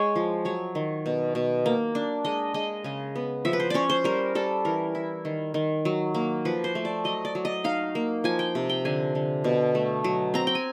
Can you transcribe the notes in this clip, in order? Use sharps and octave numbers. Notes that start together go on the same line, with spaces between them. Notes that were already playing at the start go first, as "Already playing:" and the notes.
Already playing: G#3 C#5
F3
F#3 C#5
D#3
B2
B2
A#3
D4
G#3 D#5
G#3 D#5
C#3 D#5
B3
F3 E5
B4
C5
C#4 C#5 D5
C5
G3 A#4
G3 A4
E3 A#4
E4
D#3
D#3
F#3
A#3
F3 B4
C5
A3
D5
F#3 D#5
D5
F#3
D#5
D#4 F5
A#3
F3 G#5
G5
C3
G5
D3 G#5
D3
B2
A3
F#3
C4 A#5
G5
G#5